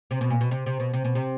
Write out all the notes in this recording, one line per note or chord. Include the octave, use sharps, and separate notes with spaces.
C3
B2
A#2
B2
C3
C3
B2
C3
B2
C3